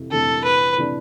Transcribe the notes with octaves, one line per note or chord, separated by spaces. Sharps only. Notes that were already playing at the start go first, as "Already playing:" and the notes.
Already playing: F2 C3 E3
F2 C3 E3 A3 D4 A4
B4
C3 E3 A3 D4